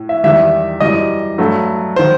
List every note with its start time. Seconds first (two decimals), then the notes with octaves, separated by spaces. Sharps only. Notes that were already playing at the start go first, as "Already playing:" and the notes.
Already playing: A2
0.09 E5
0.24 E2 D#3 G3 E5
0.80 F#2 E3 G3 D#5
1.38 G2 F#3 A3
1.96 D#3 F#3 C5